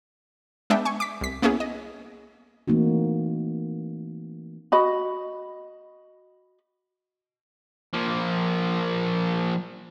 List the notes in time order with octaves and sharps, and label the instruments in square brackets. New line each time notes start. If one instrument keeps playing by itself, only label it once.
[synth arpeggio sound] G#3 B3 D4 E5 G5
G#5 C#6
D6 B6
C2 B6
A#3 B3 C#4 E4 G#4
D#5
[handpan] E3 A3 A#3 C4 D#4 F#4
[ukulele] F#4 D#5 B5
[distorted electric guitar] F3 A#3